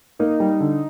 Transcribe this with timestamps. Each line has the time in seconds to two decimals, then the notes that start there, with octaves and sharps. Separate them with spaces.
0.19 A#3 D#4
0.40 G3
0.60 D3